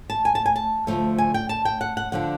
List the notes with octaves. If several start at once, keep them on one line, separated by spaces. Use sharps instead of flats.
A5
G#5
A5
G#5
A5
D2 C#3 F3 A3
G#5
G5
A5
G5
F#5
F#5
D3 F3 D4 F#5